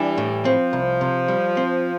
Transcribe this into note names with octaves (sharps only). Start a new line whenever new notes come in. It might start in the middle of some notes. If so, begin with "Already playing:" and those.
Already playing: E3 G3 D4
A2
F3 C4
C2
C3
G3
C4